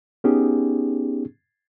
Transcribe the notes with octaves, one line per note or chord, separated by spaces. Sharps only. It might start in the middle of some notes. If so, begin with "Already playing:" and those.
B3 C#4 D#4 G4 G#4